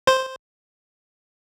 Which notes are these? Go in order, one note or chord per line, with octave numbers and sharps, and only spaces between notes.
C5